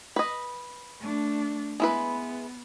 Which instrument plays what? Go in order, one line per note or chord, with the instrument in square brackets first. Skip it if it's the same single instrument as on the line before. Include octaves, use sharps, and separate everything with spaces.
[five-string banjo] B4 D#5
[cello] A3 D4
[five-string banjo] G#3 E4 B4 [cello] B3